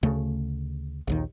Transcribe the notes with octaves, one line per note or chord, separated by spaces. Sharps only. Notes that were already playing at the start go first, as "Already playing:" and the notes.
D2 C#3 A3
A#1 D#2 D#3